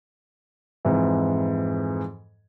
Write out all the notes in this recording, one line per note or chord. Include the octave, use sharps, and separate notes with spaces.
F2 G#2 E3